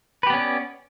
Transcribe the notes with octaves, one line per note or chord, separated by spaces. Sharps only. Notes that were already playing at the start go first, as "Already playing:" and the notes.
B3 C#4 G4 B4 D5